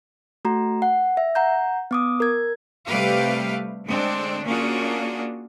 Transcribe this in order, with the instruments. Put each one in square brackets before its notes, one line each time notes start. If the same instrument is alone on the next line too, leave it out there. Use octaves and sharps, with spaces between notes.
[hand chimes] A3 F#4 A#5
F#5
E5
F#5 A#5 G6
B3 D6 D#6
A#4 G#6
[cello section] C3 G3 A3 G4 B4 F5
D3 G#3 C4 D4
A#3 C#4 D4 F4 F#4 G#4